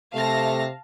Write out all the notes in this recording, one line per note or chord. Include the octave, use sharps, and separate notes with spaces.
C3 A3 F5 A5 A#6